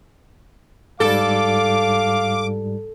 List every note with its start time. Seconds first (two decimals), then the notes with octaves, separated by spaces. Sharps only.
1.00 G#2 G3 A4 F5 D6